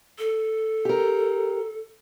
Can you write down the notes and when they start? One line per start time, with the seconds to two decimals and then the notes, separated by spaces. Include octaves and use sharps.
0.18 A4
0.85 G4 A#4